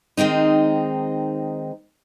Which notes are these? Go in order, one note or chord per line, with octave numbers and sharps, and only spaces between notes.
D#3 G#3 C4 D#4